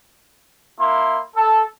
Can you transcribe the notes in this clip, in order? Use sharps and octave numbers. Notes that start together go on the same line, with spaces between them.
A#3 E4 C6
A4